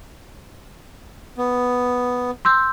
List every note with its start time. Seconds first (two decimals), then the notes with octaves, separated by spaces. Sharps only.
1.38 B3
2.45 C6 E6 G6